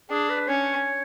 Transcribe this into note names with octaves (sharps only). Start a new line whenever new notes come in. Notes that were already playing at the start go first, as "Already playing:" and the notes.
D4 G#4
B4
C#4 C#5